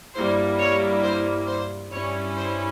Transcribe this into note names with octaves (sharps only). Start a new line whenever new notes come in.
G2 G3 A#3 E4 C5
C#5
C5
C5
G2 G3 C#4 E4 C#5
C5